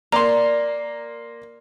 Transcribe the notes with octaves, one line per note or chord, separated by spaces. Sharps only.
A#3 D5 A#5 C6